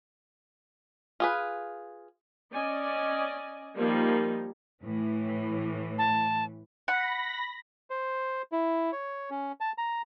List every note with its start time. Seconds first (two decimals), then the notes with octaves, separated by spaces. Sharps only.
1.20 F4 G#4 B4
2.52 C#4 D5 D#5 G#5
3.78 F3 G3 A#3 D#4
4.83 A2 E3
5.98 A5
6.88 F#5 B5 A#6
7.90 C5
8.52 E4
8.92 C#5
9.31 C#4
9.60 A5
9.78 A#5